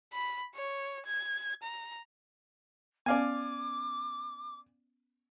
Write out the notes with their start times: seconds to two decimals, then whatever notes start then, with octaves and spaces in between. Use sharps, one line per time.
0.13 B5
0.55 C#5
1.06 G#6
1.63 A#5
3.06 B3 C#4 D5 F5 G#5 D6